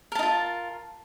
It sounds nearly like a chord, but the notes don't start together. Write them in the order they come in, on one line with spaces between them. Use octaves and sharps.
A#4 A5 D#4 F4